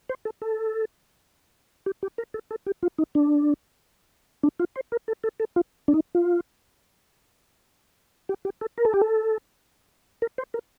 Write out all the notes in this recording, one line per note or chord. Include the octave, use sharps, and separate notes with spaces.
C5
A4
A4
G4
G4
A#4
A4
A4
G4
F4
D#4
D4
D4
F4
C5
A#4
A4
A4
A4
F4
D4
D#4
F4
G4
G4
A4
A#4
A4
G4
A4
A#4
C5
A#4